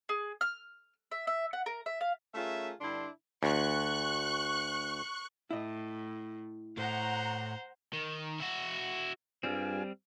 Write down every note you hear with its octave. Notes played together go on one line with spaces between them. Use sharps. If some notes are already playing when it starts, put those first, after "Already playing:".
G#4
F6
E5
E5
F#5
A#4
E5
F5
A3 C#4 F4 G#4 A#4 E5
G2 D3 D4 E4 C6
D2 C#6 F#6
A2 E4 D#5
A2 C5 F#5 A#5
D#3
E4 F#4
G2 G3 C4 F4 G#4